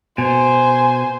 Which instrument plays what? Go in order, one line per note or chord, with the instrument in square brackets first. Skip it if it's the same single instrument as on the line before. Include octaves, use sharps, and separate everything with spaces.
[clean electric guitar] B2 [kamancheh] C5 [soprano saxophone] G#5